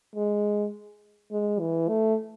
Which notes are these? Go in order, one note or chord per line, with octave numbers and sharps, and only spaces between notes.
G#3
G#3
E3
A3